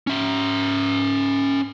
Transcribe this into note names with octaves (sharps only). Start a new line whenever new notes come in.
C#4 E5